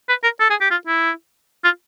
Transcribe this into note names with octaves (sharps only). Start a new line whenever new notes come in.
B4
A#4
A4
G#4
G4
F4
E4
F4